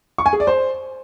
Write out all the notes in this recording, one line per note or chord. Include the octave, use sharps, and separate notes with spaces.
C#6
G#5
G#4
D5
C5